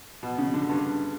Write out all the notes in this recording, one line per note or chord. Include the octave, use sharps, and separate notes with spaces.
B2
C#3
D3
G2